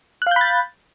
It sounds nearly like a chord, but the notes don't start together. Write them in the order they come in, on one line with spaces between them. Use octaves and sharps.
F#6 F5 G6 B5 A6